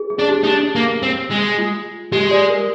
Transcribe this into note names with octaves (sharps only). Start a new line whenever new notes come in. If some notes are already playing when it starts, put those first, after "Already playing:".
Already playing: G#4
G#4
D4
G4
D#4
D4
A#3
C4
G#3
F4
G#3 G4
D5
A#4